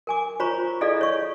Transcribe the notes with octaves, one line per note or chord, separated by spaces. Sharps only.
A#4 G#5 D6
F4 C5 C#5 A#5 B5 C#6
E4 G#4 A4 D5 D#5 F5
C#5 C#6